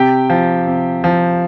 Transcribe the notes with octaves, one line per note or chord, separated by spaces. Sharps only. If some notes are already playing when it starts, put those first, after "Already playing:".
Already playing: C3 G4 G5
F3
C3
F3